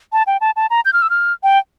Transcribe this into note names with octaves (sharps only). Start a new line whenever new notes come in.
A5
G5
A5
A5
A#5
G6
F6
E6
F6
G5